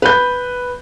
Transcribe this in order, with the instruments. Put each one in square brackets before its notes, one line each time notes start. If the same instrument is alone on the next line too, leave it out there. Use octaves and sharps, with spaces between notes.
[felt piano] B4 G6